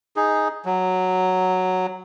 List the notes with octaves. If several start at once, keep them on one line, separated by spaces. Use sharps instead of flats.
D#4 G#4
F#3